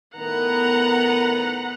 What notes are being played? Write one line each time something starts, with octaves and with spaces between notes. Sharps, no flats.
A2 D#3 B3 A#4 F#5 A#5